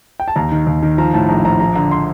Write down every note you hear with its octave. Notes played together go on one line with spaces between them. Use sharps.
G5
A5
D#2 A#5
D#3
D#2
D#3
F3 A#5
A2 A5
A#1 A#5
A#1 A#5
F3 A#5
D3 A#5
C6